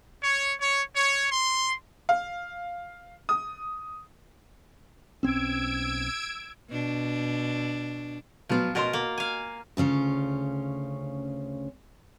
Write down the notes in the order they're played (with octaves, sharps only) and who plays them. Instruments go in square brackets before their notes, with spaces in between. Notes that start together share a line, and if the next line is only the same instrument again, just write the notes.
[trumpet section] C#5
C#5
C#5
C6
[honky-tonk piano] F5
D#6
[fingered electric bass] B1 C4 C#4 [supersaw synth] E6 G#6 D7
[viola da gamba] B2 D4
[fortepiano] B2 F#3 B3 [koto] F3 F4
[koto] B2 F4 A#4 [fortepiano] F#4 D#5 C6
[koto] A#3
F5 G#5
[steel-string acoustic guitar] D2 C#3 C#4 F4